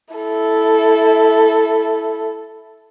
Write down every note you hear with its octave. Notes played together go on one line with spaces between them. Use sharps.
E4 A4